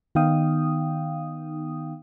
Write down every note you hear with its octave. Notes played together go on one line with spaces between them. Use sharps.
D#3 B3 D#4 F5 G5 D#6